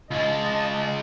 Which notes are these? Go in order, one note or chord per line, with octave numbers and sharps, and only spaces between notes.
C#2 G#3 D#5 A5